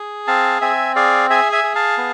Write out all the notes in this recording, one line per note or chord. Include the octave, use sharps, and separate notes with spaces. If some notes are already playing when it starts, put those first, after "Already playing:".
Already playing: G#4
C4 F5 A5
C4 E5 G#5
G#4 D5 F5
G#4 E5 G#5
E5 G#5
G#4
F5 A5
B3